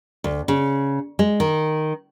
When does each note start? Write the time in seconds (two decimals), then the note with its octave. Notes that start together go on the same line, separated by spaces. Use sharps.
0.24 D2
0.48 C#3
1.19 G#3
1.40 D#3